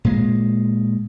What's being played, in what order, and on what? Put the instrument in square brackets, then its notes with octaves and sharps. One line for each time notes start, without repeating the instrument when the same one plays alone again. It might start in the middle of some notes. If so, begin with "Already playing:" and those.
[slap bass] A#2 G#3